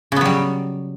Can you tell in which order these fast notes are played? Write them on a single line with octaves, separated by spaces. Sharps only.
C#3 B3 F#3 G3